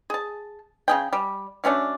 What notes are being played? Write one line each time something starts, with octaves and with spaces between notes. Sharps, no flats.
G#4 A5
C#3 G#4 G5
G3
F#3 A3 C#4 D4